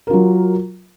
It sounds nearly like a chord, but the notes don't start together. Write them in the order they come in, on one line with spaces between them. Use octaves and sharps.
A#4 F4 F#3